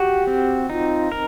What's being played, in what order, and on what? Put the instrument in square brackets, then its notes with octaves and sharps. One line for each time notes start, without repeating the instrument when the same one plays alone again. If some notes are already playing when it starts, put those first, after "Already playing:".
Already playing: [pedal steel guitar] F#4 [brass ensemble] G4
[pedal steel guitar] C4
[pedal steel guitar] D#4 [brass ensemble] F4
[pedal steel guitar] A#4